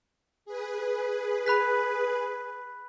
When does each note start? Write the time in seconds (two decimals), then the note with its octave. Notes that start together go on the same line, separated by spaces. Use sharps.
0.45 G#4 B4
1.46 B5 F#6 B6